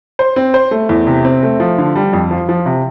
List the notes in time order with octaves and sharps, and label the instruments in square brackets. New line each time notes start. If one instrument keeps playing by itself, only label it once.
[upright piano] C5
C4
C5
A3
E2
C3
C4
A3
F3
D3
G3
F2
F3
F3
C3